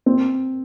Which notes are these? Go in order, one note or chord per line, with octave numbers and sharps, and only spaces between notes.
C4